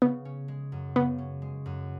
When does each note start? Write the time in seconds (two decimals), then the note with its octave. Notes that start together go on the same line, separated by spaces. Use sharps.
0.02 C#3 B3
0.25 C#4
0.48 G#3
0.72 F#2
0.96 C#3 B3
1.18 C#4
1.42 G#3
1.66 F#2